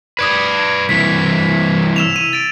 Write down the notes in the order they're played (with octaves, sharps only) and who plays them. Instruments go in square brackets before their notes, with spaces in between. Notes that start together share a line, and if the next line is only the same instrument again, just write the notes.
[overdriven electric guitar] B4 D5 [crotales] D#6 G#6
[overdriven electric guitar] C2 E3 [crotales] B6
[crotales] E6 E7 F7
D#7
A6 D7